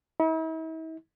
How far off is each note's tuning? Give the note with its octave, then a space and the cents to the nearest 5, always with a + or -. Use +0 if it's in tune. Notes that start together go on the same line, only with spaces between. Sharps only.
E4 -45